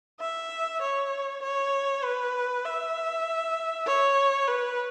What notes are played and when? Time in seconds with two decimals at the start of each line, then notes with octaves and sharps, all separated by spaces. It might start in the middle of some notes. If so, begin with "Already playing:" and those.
0.20 E5
0.81 C#5
1.42 C#5
2.04 B4
2.65 E5
3.86 C#5
4.48 B4